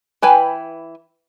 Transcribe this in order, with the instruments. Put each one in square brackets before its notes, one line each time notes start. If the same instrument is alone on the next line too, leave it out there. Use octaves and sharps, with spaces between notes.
[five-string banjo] E3 B4 G5 G#5